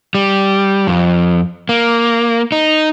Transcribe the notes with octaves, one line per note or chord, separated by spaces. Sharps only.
G3
F2
A#3
D#4